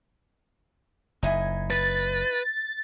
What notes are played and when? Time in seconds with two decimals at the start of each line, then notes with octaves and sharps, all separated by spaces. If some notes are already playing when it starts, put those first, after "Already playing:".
1.23 F#1 D#4 E4 G#5
1.70 B4 A6